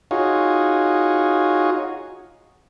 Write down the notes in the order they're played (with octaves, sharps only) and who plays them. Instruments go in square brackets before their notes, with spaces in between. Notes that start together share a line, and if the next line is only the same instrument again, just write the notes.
[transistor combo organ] D#4 F4 F#4 G#4 C#5